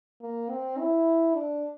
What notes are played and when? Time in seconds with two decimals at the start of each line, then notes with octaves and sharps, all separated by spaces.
0.21 A#3
0.50 C4
0.79 E4
1.36 D4